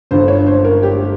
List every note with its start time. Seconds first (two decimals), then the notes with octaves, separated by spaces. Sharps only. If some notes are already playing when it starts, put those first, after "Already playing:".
0.11 G1 G2 D3 C5
0.28 C#5
0.47 C5
0.64 A#4
0.83 G4